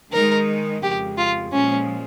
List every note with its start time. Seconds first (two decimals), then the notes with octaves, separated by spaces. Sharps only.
0.12 D#3 G#3 D#4 A#4
0.83 F2 C#3 G#3 G4
1.17 F4
1.52 A#2 F3 G#3 C#4